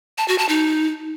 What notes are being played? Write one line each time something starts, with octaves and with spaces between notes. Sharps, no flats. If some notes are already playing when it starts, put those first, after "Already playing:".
A5
F#4
A5
D#4